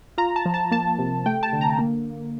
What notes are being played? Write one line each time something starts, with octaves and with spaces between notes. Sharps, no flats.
F4 A#5
A5
F3
A5
A#3 A5
C3
A3 G5
A5
D3
A#5
A#3